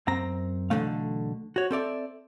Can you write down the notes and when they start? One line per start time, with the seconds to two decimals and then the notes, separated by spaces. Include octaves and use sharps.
0.07 F#2 C4 A#5
0.70 B1 F2 D3 E3 A3 F5
1.56 F#4 C#5
1.71 C4 A4 D5 E5